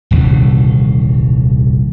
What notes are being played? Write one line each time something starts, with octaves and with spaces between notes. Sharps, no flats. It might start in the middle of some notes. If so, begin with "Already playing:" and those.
D#1 C2 D#3 E3